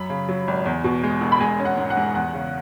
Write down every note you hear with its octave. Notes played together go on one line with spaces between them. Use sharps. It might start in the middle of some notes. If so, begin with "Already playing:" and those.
Already playing: F#2 B5
C#3
F#3
G#1
E2
B2
G#3
E1
B5
G#3 G#5
C#4
F#5
G#2
F#5
G#2
E2 F#5
C#3